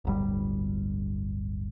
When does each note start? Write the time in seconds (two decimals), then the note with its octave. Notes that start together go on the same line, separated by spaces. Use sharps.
0.05 D1 G1 G3